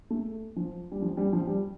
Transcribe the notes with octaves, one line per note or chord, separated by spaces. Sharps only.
A3
F3
G3
F3
G3
F3
G3